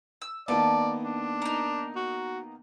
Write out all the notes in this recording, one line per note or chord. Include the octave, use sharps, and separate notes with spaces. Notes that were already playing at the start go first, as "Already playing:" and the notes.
E6
D#3 A#3 B3 D5 A5
D4
D#4 A#4
F#4